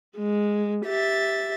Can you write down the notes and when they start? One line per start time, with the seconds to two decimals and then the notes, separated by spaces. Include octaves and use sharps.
0.16 G#3
0.86 G4 E5 A6